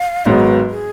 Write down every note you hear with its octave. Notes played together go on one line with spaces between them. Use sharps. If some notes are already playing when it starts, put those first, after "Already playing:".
Already playing: F5
G#1 G#2 F#3 B3 C#5
B4
G#4